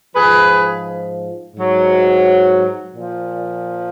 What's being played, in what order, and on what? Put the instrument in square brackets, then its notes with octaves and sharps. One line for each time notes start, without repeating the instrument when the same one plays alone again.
[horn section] G#2 F3 G#4 B4
G#2 F#3
A#2 F3